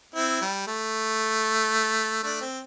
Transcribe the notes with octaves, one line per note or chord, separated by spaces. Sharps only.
C4 E4
G3
A3
A3 D4
C4